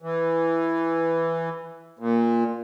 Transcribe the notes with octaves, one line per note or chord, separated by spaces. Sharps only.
E3
A#2